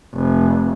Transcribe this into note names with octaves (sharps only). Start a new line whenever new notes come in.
F1